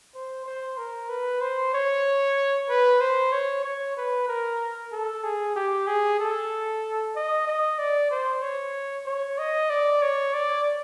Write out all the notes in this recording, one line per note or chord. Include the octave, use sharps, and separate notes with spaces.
C5
C5
A#4
B4
C5
C#5
B4
C5
C#5
C#5
B4
A#4
A4
G#4
G4
G#4
A4
D#5
D#5
D5
C5
C#5
C#5
D#5
D5
C#5
D5